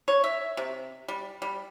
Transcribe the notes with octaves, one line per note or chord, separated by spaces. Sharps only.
C#5
E5
C3
G3
G3